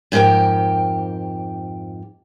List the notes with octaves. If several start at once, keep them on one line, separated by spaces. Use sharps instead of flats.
F2 G#2 G4 A#4 G5